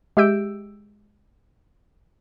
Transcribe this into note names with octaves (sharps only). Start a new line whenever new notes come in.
G#3 G4 E5 E6 G6 D7